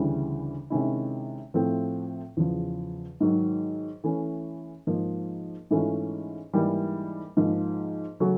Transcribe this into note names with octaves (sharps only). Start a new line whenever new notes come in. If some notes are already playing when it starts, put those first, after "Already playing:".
Already playing: D2 C#3 E3 G3
C3 D#3 G#3 C#4 E4
A2 F3 A3 C4
E2 C#3 F3
G#2 D#3 F#3
E3 A3 C#4
G#2 F3 A#3
G#2 E3 A3 C#4 F4
G#2 E3 G3 A#3
G#2 F3 A#3
C#3 F#3 A3 C#4 F#4